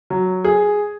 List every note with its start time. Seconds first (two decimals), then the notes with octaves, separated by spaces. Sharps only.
0.10 F#3
0.45 G#4